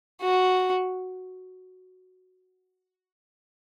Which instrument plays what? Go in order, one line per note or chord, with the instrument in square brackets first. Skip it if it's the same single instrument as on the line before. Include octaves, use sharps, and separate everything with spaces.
[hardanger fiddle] F#4